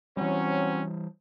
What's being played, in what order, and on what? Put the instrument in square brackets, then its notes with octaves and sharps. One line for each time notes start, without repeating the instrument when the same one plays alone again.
[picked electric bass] E3 G3 [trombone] F#3 [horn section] C4 C#4